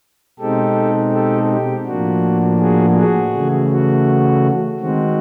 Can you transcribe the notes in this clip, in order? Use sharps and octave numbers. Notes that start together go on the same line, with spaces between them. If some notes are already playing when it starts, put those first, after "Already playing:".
B2 G#3 C4 D#4 G4 A4
G4 A4
G4
A2 F3 A#3 D4 F#4
F#4 G#4
F#4 G#4
C#3 E3 A3
F#4
D#3 G#3 C4 F#4